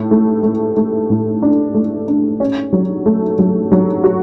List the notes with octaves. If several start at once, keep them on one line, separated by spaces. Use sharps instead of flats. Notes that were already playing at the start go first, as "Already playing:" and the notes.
Already playing: A2
A3
A3
A3
A2
D4
A3
D4
C#4
F#3
A3
F#3
F#3
F#4